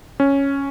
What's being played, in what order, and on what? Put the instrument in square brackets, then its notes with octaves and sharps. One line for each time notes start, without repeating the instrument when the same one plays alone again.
[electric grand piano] C#4